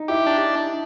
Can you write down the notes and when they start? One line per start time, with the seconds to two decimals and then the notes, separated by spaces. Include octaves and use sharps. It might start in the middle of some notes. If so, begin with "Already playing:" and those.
Already playing: D#4
0.08 E4 G4
0.26 D4